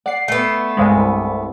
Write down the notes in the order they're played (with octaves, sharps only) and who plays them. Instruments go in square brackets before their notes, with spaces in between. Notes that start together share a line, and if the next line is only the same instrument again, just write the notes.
[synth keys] D5 C7 [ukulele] F#5
[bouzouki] A3 B3
[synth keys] C2 G2 G#3 [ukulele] C5 F5 G#5
[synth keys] C2